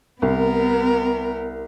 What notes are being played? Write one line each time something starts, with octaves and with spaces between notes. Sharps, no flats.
C2 B3 A#4